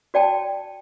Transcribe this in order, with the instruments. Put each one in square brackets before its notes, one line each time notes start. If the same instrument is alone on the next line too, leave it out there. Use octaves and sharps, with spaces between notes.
[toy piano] F#4 D5 G5 A5